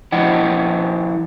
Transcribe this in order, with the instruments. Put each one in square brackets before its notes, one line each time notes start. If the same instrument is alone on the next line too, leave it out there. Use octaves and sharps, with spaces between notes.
[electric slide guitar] F3 E4 D#5 F#5 G5